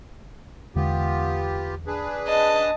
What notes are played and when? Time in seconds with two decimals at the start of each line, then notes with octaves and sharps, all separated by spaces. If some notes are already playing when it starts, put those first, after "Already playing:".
0.76 E2 D3 G#3 B3 F4 G4
1.87 D4 G#4 B4
2.27 D#5 A5